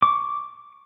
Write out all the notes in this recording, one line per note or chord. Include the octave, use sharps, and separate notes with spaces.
C#6 D6